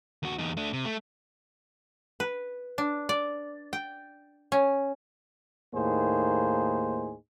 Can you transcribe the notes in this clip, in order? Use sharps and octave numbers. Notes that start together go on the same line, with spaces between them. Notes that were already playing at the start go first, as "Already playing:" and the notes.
D#2 F#4
E2 D#4
A3 D4
C3
A3
B4
D4
D5
G5
C#4
D#2 A2 A#3 D#4 G#4 C5